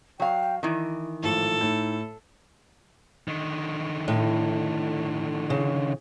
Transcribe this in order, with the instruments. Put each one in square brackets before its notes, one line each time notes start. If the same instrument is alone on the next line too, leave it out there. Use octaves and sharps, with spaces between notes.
[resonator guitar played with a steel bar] F#3 F5 [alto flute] G5
[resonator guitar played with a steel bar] D#3 E3 [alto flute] E4
[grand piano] G#1 A2 F3 [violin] A4
[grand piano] A2 [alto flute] D#4
[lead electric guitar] D3 D#3
[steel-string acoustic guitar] A2
C#3